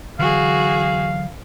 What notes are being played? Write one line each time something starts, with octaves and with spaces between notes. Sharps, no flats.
D3 E3 F#3 F#4 G#4 F5